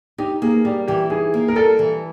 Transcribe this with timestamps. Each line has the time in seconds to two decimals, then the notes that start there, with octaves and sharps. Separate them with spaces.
0.18 D#4 G4
0.42 A#3 G#4
0.65 G3 G4
0.88 E3 G4
1.10 D#4 G#4
1.34 A#3
1.48 A#4
1.56 G3 A4
1.79 E3